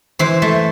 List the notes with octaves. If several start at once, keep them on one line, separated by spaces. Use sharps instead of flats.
E3 C5
A3